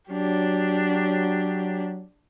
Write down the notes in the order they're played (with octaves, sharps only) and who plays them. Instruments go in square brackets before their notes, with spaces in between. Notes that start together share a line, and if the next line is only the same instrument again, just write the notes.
[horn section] F#3 [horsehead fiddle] D4 G4